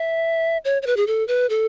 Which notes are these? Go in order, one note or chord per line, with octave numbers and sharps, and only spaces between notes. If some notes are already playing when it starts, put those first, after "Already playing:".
Already playing: E5
C#5
C#5
B4
G#4
A4
B4
A4